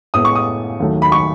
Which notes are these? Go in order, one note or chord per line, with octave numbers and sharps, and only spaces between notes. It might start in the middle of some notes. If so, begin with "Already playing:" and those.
A2 G#3 B3 D#6
C#6
D#6
D#2 D#3 F#3 A3
B5
C#6